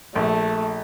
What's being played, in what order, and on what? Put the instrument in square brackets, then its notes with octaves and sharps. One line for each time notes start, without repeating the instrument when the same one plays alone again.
[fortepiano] A#1 [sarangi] A3